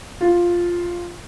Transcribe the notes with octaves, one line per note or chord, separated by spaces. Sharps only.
F4